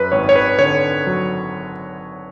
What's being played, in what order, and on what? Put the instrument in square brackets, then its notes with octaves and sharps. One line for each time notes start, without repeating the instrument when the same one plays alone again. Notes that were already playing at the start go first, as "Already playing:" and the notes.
Already playing: [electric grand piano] F#2 B4
G#1 C#5
C#5
B4
D3 C#5
F#3